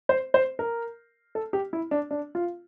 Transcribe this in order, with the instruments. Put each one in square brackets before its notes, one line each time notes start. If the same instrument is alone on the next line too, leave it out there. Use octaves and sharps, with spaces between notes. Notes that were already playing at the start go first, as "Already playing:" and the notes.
[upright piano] C5
C5
A#4
A4
G4
E4
D4
D4
F4